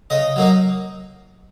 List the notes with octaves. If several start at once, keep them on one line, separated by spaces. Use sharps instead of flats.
C#3 D#5
F#3 A#3 D#4